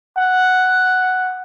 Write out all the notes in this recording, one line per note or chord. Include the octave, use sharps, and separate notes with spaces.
F#5